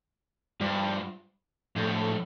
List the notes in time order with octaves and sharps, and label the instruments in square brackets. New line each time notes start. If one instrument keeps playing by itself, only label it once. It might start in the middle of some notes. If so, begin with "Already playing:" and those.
[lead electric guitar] G2 [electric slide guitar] G3 F4 C5
[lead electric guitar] A2 [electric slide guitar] F3 D4 A4 C5